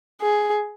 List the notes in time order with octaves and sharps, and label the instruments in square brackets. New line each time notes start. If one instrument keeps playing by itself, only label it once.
[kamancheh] G#4